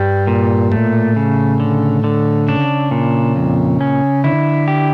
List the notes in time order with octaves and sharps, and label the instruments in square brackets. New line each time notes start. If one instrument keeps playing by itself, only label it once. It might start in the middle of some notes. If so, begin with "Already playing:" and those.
Already playing: [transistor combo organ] G2 [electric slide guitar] G3
[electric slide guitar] A#2
[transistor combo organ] A2 [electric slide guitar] A3
[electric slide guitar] C#3
D3
D3
[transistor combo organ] C#3 [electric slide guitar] D4
[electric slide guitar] A#2
F2
C#4
[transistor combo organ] D3 [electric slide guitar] E4
[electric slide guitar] G4